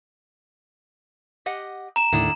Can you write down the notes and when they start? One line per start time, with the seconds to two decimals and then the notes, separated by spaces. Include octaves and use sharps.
1.46 G4 D#5 F#5
1.96 A#5 E7
2.13 D#2 A2 D3 D#3 E4